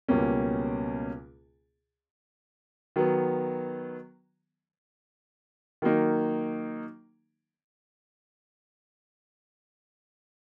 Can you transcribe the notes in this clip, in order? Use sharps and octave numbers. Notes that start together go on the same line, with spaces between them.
C#2 B2 G3 A#3 C#4
D#3 F#3 B3
D#3 F#3 A#3 D#4